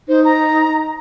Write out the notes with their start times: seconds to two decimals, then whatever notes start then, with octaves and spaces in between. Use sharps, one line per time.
0.08 D#4 C5
0.24 A#5